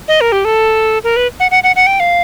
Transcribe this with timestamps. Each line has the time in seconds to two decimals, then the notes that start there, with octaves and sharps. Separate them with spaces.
0.08 D#5
0.21 A#4
0.32 G4
0.45 A4
1.04 A#4
1.16 B4
1.40 F#5
1.51 F#5
1.63 F#5
1.76 F#5
1.87 G5
2.00 F5